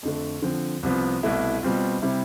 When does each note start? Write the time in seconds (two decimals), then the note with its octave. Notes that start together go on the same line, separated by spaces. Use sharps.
0.03 F2 D3 A3
0.42 D3 F3 C4
0.83 C2 C3 F3 B3
1.23 C2 B2 A3 E4
1.63 B2 G3 C4 F4
2.02 C3 G3 C4 E4